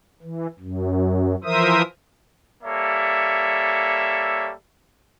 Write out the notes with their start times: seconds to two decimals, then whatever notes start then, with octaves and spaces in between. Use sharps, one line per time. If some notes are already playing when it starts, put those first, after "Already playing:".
0.23 E3
0.60 F#2
1.44 E3 F3 A#4 C5 E5 D#6
2.63 G3 A#3 A4 C#5 E5